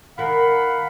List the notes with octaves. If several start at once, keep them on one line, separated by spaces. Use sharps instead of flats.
D#3 A#4 F5 F#5 B5